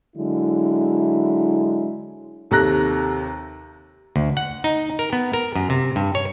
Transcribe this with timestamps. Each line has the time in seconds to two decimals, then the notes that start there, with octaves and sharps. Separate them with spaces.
0.16 D3 F#3 G#3 E4
2.51 D#2 C3 A4 A#5 F#6 A#6
4.16 D2
4.37 F#5
4.64 D#4
4.99 A#4
5.13 B3
5.33 A#4
5.55 F#2
5.70 C3
5.96 G2
6.15 C#5